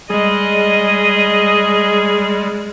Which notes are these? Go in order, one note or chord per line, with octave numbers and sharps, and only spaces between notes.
G3 G#3 G#4 D#5